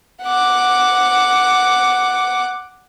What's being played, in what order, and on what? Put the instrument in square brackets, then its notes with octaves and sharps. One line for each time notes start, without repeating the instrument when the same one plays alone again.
[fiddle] F#5 D6